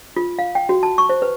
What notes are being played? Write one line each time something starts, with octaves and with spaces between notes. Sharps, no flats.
F4
F5
G5
F#4
A5
C#6
C5
B4